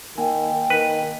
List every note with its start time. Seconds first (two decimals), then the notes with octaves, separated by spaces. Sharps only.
0.18 D#3 A#3 G5 G#5
0.70 D#3 B4